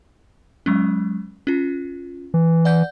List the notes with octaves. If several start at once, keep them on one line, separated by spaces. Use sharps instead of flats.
F#3 G#3 C#4
C#4 F4
E3
D5 F#5 G6